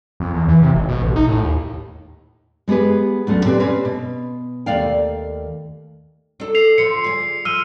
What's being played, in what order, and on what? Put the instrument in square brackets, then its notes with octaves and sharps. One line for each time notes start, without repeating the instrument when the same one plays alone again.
[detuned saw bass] F2
E2
E3
C3
G#1
B2
A1
D#4
A2
D#2
[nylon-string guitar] G#3 B3 G4 G#4 B4
D2 F#3 A3 C#4
A#2 C4 G4 B4 D5
C4 C#4 B4
B2
D#2 A3 D5 F5 G5
[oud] D4 A4
[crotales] C7 F7
[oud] D3 F3 F4 [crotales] C#7
[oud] G#4 D5
[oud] F3 [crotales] E6 F6 D#7